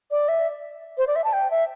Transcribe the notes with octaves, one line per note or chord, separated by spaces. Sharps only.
D5
E5
C5
D5
E5
A5
G5
E5